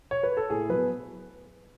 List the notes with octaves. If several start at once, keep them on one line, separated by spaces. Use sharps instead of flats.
C#5
B4
A4
A2 G#4
F#3 B3 B4